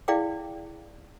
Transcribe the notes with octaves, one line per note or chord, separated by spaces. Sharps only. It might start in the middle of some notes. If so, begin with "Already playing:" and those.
E4 G#4 D5 F5 G5 D6